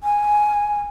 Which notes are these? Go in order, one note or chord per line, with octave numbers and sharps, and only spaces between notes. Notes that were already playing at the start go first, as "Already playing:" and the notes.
G#5